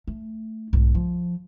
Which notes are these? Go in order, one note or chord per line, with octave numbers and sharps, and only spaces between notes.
A3
B1 G#2
F3